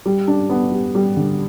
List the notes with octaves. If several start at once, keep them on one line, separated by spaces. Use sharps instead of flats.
G3
D4
B3
G3
G3
D3